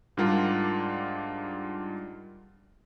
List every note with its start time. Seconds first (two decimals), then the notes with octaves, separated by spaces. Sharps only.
0.17 G#2 G3 D4 F4 A#4 F#5